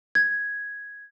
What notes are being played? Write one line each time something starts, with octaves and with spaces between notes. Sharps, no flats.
G#6